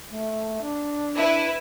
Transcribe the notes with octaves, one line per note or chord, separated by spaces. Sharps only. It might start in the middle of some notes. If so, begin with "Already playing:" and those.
A3
D4
E4 B4